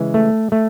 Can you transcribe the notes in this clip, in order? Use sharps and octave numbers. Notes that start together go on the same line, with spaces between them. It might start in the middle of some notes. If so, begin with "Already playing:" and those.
Already playing: C#3 E3 G#3
A3
A3